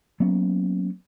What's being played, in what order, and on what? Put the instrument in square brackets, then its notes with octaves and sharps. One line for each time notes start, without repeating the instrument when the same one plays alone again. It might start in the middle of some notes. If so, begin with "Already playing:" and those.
[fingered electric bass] F#3 A#3 B3 C#4